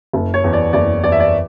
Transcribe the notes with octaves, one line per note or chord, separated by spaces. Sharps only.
F#1
C#5
E2
D5
F#1 D5
E2 D5
E5
D5